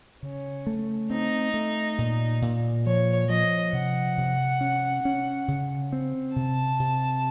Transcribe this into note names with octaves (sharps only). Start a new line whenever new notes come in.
C#3 C#4
A3
C4 D#4
A3
A#2
A#2
F3 C#5
F3 D#5
C3 F#5
C3
C#4
C#4
C#3
C4
C3 A5
C3